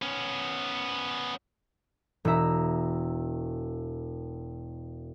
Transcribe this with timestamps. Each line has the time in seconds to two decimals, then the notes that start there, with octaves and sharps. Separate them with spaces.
0.02 B3 C#4
2.25 E1 E4 E5 A#5